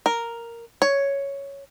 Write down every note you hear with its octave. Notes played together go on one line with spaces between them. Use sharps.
A#4
C#5